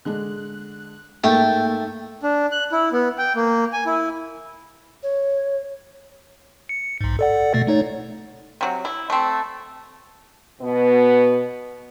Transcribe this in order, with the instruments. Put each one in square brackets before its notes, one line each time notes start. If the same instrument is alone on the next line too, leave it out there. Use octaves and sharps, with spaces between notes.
[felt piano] D3 G#3 D4 [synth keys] F#6
[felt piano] G#2 A4 [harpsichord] A3 [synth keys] A#3 E5 A6 [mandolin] G5
[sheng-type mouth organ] D4
F#6
E4
B3
G5
A#3
G#5
E4
[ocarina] C#5
[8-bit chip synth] C#7
B1 G#2
A4 D5 F#5
B2 A3 A6
A3 D#4 C#5
[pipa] C3 F#3
E4
A3 C4
[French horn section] B2 B3